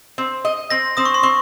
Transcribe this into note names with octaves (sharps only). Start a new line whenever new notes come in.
C4
D#5
C4 A#6
C4 D#6
C#6
C6
C4 C#6